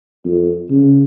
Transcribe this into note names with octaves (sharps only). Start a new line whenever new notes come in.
F2
C#3